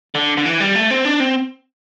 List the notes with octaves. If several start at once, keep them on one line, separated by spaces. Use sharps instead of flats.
D3
D3
E3
G3
A3
C4
D4
C4